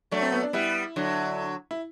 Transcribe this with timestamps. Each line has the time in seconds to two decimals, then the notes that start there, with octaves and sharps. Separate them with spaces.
0.11 F#3 A3 D4
0.22 C4
0.32 B3
0.43 D4
0.53 G3 B3 E4
0.96 D3 F#3
1.71 E4